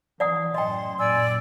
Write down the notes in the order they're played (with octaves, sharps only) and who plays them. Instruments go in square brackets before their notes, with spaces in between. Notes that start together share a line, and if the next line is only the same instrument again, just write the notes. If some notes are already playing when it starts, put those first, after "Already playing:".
[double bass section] E3 [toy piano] D5 F#5 D#6
[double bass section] F#2 A2 [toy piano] D#5 G5 [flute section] C6
[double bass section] F#2 A#2 [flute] D5 [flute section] G#5 E6